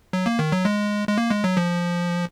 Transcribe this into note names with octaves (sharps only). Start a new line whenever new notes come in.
F#3
A#3
D#3
F#3
G#3
G#3
A#3
G#3
F#3
F3